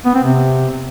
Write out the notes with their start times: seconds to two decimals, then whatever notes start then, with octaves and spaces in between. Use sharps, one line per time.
0.05 B3
0.14 C4
0.24 C3